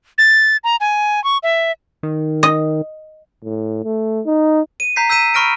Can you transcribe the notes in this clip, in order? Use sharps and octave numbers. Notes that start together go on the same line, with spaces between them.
A6
A#5
G#5
C#6
E5
D#3
D#5
A2
A3
D#4
D#7
A#5 G6 B6 C7
E6 G6 B6 D#7 E7
B5 C#6 F6 A#6 D7